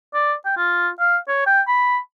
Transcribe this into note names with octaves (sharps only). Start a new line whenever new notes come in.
D5
G5
F4
F5
C#5
G5
B5